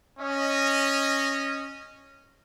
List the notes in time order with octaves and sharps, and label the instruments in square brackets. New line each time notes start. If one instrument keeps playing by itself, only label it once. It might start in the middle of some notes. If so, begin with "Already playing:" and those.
[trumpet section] C#4 D#5